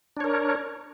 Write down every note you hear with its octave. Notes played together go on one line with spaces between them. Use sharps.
D4 A#4 C#5